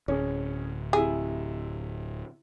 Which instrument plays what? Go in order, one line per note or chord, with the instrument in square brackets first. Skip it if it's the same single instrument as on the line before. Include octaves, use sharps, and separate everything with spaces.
[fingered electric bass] D1 [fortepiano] C#4 G#4
[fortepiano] C3 E4 [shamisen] G#4